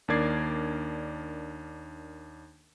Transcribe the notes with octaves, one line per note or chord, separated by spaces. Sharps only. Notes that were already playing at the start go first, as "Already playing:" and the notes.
D#2 D4 A#4 D5 G#6 C7